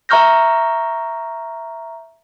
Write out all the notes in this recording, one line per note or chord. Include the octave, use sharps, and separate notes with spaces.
E5 A#5 C#6 F6 G6 A#6